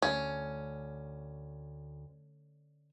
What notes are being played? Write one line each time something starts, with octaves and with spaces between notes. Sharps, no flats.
D2 C#4